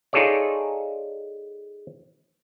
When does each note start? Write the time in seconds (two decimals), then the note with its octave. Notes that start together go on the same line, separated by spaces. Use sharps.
0.13 D#4 F4 G#4 A4 C#5 D5